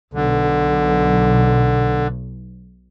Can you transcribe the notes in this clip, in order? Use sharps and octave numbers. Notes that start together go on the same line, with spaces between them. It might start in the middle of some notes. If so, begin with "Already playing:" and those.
B1 D3